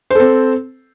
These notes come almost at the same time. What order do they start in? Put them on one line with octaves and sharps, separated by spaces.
C5 A4 C4